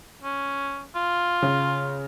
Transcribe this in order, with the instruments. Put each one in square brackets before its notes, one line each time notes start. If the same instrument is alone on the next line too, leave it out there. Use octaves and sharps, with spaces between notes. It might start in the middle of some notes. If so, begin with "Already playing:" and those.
[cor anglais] C#4
F4
[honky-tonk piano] C#3